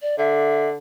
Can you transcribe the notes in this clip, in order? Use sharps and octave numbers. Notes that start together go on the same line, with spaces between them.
D5
D3 E5